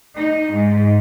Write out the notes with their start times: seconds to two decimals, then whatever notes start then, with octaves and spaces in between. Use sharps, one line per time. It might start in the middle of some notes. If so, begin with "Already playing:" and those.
0.16 D#4
0.53 G#2